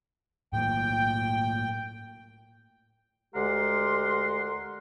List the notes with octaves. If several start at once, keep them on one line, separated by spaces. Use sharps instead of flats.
A2 F#3 A#3 G5
D2 G#3 G4 A#4 F#5 C6